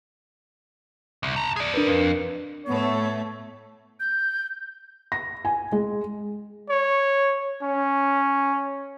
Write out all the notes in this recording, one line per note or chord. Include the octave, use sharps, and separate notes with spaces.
C2
A5 A#5
G#4 D5
D4 A#4 B4
F2
A2 A3 B3 C#5
G6
A#6
G#5
G#3
C#5
C#4